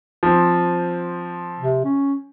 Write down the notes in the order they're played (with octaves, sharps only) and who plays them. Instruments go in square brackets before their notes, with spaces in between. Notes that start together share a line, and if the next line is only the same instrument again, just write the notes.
[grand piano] F3 C4
[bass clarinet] C3
C#4